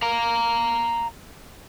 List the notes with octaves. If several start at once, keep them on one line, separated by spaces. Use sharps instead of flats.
F5 A#5